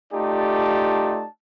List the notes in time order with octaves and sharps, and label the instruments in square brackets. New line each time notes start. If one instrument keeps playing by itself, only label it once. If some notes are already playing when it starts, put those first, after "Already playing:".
[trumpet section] A3 D#4 F4 G4 D5 A5